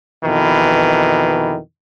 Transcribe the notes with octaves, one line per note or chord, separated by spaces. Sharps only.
F2 B2 D#3 E3